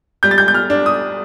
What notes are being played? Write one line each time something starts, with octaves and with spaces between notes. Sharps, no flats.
G3 G6
A6
G6
G6
F6
D4
D#6